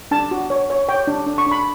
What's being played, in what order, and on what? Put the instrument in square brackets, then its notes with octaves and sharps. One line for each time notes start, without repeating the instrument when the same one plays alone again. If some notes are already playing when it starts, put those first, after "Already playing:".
[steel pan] D4 A5
F#4
C#5
C#5
C#5 G5
D4
D4
C#6
D4 B5